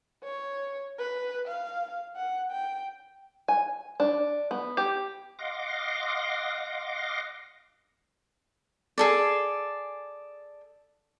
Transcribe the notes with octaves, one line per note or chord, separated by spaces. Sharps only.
C#5
B4
F5
F#5
G5
G#5
D4
B3
G4
D#5 F5 F#5 C6 D6 A#6
G#4 A4 D5